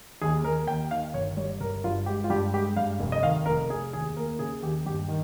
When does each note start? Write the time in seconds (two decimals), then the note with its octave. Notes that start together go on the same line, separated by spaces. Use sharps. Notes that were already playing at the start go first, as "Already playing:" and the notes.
0.21 D#2 G#4
0.44 D#2 A#4
0.67 D#2 G5
0.91 D#3 F5
1.14 G1 C#5
1.37 G3 C#5
1.60 G1 A#4
1.84 G2 F4
2.06 G#3 G4
2.24 F4
2.30 G2 G4
2.54 G#3 G4
2.76 G2 F5
3.00 F1
3.12 D#5
3.23 D#3 F5
3.46 F1 A#4
3.70 F1 G#4
3.93 D#2 G#4
4.16 A#3 A#4
4.39 C#3 G#4
4.62 D#2 G4
4.85 G2 G4
5.08 D#3